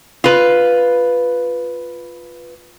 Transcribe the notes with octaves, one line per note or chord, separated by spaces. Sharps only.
F4 B4